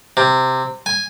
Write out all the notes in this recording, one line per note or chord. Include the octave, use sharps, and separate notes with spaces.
C3
G#5